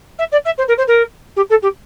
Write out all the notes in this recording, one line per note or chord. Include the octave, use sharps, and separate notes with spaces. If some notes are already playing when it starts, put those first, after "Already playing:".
E5
D5
E5
C5
A#4
C5
A#4
G4
A4
G4